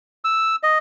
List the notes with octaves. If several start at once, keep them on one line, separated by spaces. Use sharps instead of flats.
E6
D#5